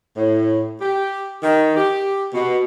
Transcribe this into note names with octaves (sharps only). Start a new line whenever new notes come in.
A2
G4
D#3
G4
B2